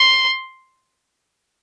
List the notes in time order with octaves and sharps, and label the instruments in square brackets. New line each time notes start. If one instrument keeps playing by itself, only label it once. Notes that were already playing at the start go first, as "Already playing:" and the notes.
Already playing: [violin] C6